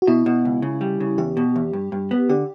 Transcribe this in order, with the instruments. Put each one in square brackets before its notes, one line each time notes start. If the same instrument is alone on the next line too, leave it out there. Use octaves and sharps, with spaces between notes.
[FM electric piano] F#4
[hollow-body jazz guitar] B2 [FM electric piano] E4
[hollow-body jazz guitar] B2
C#2
C#3
G3
C#3
[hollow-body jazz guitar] E2 [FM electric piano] G4
[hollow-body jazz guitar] B2
E2
G2
G2
B3
[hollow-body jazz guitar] D3 [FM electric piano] G4